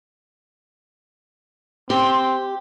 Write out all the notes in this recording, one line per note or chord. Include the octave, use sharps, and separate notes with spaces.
C4 G4 C6